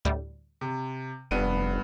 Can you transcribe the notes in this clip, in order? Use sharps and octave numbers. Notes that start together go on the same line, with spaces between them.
D2 A2 G3
C3
F1 G2 B3 D#7